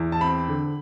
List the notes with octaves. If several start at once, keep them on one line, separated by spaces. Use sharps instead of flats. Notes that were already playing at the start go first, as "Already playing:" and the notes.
Already playing: E2
A5
C4 B5
D3